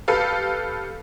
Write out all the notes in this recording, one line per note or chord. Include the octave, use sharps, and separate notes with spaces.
G4 A4 B4 F5